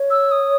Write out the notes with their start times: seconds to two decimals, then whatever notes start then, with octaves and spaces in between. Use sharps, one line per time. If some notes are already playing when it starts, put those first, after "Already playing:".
Already playing: C#5
0.11 E6
0.31 D#6